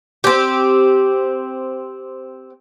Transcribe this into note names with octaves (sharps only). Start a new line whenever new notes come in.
C4 G4